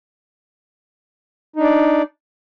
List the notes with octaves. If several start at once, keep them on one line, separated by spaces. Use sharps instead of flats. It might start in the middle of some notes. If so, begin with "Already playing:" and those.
D4 D#4 D5